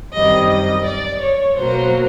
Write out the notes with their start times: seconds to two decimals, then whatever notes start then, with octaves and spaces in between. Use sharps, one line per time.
0.14 F#2 D#3 G3 C4 D#5
0.50 D#5
0.85 D5
1.21 C#5
1.57 B2 F#3 A#3 C5